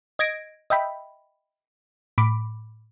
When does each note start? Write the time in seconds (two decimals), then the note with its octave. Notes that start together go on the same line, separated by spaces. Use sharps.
0.19 D#5 G#6 A#6 D7
0.70 D#5 E5 G5 B5
2.18 A2 B5 D6